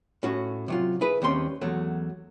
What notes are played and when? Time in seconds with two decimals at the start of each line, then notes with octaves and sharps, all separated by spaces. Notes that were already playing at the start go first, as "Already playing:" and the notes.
0.23 A2 C#4 F#4
0.68 C3 F#3 F4
1.01 E4 G#4 B4
1.22 D#2 G3 C4 C#4 C6
1.61 E2 F#3 A3